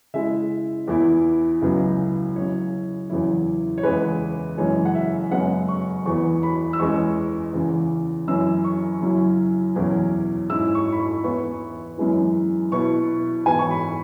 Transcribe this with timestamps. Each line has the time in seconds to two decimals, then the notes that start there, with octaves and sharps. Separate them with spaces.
0.14 C#3 G#3 E4 E5
0.88 E2 E3 B3 E4
1.62 C#2 C#3 F#3 B3 E4
2.36 C#3 F#3 E4 C#5
3.10 E2 C#3 F#3 E4
3.78 C#5
3.83 E2 C#3 E3 G#3 E4 B4
4.58 F#2 C#3 E3 G#3 C#5
4.85 F#5
4.95 E5
5.31 F#2 C#3 G#3 B3 F#5
5.68 C#6
6.06 E2 E3 B3 C#6
6.43 B5
6.73 E6
6.79 E2 E3 G#3 C#4 C#6
7.53 E2 C#3 E3
8.28 F#2 E3 C#4 E4 E6
8.64 C#6
9.02 F#2 C#3 F#3 C#4 E4
9.75 E2 B2 F#3 C#4 E4
10.49 G#2 G#3 C#4 E4 E6
10.75 C#6
10.92 B5
10.99 C#6
11.23 E2 E3 B3 E4 C#6
11.98 F#2 E3 G#3 B3 E4
12.72 B2 B3 E4 C#6
13.46 G#2 E3 B3 E4 G#5
13.59 C#6
13.71 B5